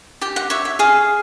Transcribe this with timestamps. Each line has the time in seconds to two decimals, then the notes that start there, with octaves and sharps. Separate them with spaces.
0.21 G4 G5
0.36 F#5
0.50 C#5 E5
0.65 E5
0.79 G#4 F5